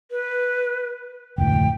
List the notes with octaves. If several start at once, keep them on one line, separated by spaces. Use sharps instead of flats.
B4
F1 D2 A2 G5